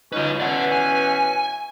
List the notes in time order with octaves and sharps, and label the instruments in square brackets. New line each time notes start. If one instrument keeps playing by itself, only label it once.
[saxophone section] C#4 D#4 [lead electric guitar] F4 B4
[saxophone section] B2 E3 C#4 [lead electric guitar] D5 F#5
[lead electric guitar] G#5